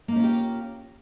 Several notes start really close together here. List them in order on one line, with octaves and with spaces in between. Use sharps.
A#3 D#4 C#4 F4 G4